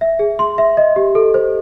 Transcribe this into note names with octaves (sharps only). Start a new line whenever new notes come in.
E5
G#4
C6
E5
D#5
G4
A4
C5